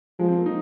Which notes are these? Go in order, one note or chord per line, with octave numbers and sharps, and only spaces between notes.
F3 G#3
C4
A#3
D#4